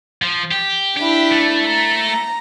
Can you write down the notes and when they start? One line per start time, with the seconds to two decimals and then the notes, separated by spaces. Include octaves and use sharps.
0.22 F3
0.51 G4
0.97 D4 E4 G4
1.31 A3
1.67 A#5